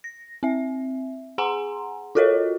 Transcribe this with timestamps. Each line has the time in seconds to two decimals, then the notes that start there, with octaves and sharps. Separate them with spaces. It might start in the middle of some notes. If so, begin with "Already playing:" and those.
0.04 A#6
0.43 C4 E5
1.38 G#4 F#5 G#5 A#5 C6
2.15 F4 F#4 A4 A#4 C#5 D#5